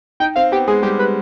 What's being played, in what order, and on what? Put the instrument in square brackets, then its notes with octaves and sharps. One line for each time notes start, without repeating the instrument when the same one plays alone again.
[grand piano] D#4 [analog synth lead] G5
[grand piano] C4 [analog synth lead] F5
[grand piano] B3 [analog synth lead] G4
[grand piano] G#3 [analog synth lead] G#4
[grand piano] G3 [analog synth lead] G4
[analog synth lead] B4